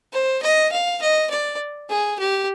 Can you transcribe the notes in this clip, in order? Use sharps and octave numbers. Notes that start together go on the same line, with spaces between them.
C5
D#5
F5
D#5
D5
G#4
G4